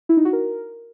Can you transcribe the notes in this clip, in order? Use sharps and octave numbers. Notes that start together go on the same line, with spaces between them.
E4
D#4
F#4
A#4